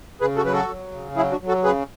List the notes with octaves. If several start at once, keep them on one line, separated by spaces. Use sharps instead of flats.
C#3 G#4 B4
F#4 A4
F#3 B4
F#4 A4
F#3
C#3
F#3 E4 G#4
D4 F#4
F#3
F#4 A4
C#3 G#4 B4